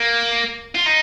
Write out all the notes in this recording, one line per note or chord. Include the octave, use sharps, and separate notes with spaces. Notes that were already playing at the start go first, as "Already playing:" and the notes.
Already playing: A#3
F4
D#4